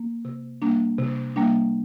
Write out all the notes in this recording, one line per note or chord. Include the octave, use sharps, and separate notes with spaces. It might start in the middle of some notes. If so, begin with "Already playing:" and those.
Already playing: A#3
C3
G3 A#3 D4
C3
G3 A#3 D4